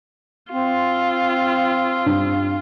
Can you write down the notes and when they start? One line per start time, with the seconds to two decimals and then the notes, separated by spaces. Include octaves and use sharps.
0.52 C4 F4
2.06 G2